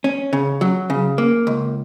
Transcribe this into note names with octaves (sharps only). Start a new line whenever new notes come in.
C#4
C#3
F#3
C#3
A#3
C#2